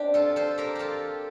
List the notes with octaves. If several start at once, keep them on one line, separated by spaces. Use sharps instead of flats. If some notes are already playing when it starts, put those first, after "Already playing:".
Already playing: C4 D4 G4
F4 A4
A4 C5
G4 A#4
F4 G4 A4